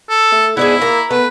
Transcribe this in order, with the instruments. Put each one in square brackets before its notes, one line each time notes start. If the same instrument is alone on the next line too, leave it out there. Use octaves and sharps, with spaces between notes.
[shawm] A4
[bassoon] A3
[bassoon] G#2 [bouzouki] B3 D4 G#4 [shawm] E4
[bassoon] A#3 [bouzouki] A#5
[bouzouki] A3 [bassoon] B3 [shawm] B4